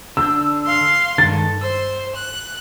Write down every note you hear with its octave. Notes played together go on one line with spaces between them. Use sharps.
D3 D4 E6 G6
F5 C6
G2 D#3 G#3 A4 A6
C5 E6
F#6